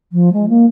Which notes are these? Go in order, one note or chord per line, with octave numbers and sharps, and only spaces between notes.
F3
G#3
A#3